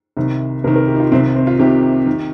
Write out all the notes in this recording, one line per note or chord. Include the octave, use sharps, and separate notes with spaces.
C2 C3 D#3
C2 C3 D#3 A#4
A#4
G4
D#4
F4
C2 C3 D#3 C4
C4
F4
C2 C3 D#3 G4
D#3